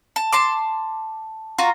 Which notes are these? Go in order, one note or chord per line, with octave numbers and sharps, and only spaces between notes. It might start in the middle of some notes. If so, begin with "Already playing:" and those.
A5
A5 C6 D6
F4 F#4 A#5